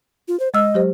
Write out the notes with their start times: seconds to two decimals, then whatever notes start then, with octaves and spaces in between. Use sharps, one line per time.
0.28 F4
0.40 C5
0.54 G#3 D#5 E6 F6
0.74 F#3 G4 C5